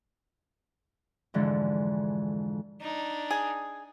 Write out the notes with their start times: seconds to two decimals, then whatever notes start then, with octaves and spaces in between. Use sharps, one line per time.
1.34 F2 G#2 D3 E3
2.81 D4 D#4
3.31 G#4